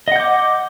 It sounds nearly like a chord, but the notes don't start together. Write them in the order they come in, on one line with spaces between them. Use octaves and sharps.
D#5 F#5 G6 D6